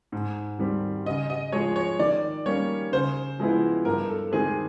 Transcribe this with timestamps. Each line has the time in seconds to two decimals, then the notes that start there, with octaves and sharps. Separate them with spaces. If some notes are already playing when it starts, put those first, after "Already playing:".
0.12 G#2
0.59 D#3 G3 C4
1.06 C#3 D#5
1.30 D#5
1.52 F3 G#3 C#5
1.76 C#5
1.99 D#3 D5
2.46 G3 A#3 C#4 C#5
2.92 C#3 C5
3.39 F3 G#3 B3 E4
3.85 G2 A#4
4.10 A4
4.32 D#3 G#3 C4 G#4